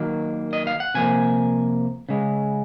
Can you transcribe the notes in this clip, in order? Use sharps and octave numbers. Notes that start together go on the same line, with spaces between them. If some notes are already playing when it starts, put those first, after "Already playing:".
Already playing: D#3 F#3 A#3
D#5
F5
F#5
C3 F3 A#3 G#5
C#3 G#3